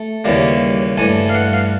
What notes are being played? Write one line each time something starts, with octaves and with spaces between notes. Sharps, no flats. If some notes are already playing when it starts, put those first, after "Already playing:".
Already playing: A3
D#2 C#3 E3 G3 A#3
G2 E3 A3 G#5
F5
F#5
F5